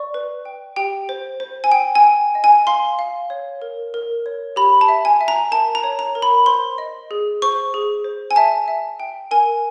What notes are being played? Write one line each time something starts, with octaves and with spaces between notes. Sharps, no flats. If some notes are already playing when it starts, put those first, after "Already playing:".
Already playing: D5 C#6
B4
G5
G4 G5
C5
C5
G#5
G5
G#5
G5
D#5
G#5
F5 C6
F5
C#5
A#4
A#4
C#5
G4 B5
A5
E5
G#5
E5
A#5
A#4 A5
A#5
C#5
A#5
A#4
B5
C5 C6
D#5
G#4
C5 C#6
G#4
C5
G#5
E5 A5
E5
G5
A#4 G#5